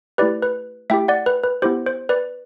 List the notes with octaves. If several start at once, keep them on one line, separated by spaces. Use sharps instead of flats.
A3 E4 G4 B4 D5
B4
A3 E4 G4 E5 G5
D5 F#5
B4
B4
B3 E4 G4 C5
C5
B4 D5